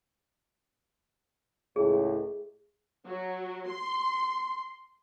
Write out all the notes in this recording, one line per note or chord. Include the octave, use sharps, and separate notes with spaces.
C#2 A2 G#4
F#3
C6